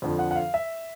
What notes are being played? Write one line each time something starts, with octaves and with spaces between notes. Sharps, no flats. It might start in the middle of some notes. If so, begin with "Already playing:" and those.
F2 D3 F3
F#5
F#5
F5
E5